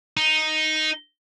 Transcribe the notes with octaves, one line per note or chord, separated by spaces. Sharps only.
D#4